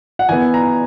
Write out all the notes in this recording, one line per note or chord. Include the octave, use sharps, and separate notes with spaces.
F#5
E3 B3 G#5
A#5